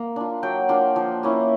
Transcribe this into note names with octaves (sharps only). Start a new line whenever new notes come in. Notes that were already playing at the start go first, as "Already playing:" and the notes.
Already playing: A#3
D4 F4
F#3 G5
A#3 D4 F4
F3
A#3 C#4 E4